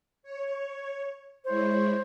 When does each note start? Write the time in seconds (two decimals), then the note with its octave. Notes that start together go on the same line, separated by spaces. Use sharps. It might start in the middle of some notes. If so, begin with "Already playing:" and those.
0.23 C#5
1.45 G#3 E4 C5 C#5